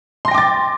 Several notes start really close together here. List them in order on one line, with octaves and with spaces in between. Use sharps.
C6 A#6 G5 D6 A6